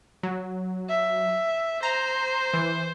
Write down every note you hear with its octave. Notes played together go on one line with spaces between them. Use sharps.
F#3
E5
C5 A#5
E3